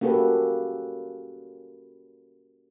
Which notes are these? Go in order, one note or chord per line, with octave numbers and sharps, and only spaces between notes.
A#3 C#4 F#4 G4 A4 B4